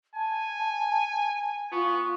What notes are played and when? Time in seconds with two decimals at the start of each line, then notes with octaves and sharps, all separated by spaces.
0.15 G#5 A5
1.72 B3 F4 C#6